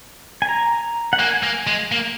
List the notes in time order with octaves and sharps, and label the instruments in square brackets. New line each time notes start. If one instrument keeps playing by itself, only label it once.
[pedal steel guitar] G#5
A#5
F#5
[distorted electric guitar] A#3 [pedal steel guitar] G#5
[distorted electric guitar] A#3
G#3
A#3